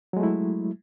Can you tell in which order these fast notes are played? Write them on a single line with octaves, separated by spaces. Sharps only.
F#3 G#3 A3 E4